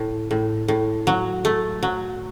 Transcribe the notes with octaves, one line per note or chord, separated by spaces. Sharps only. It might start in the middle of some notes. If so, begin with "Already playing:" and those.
Already playing: A2
A2
A2
F#3
A3
F#3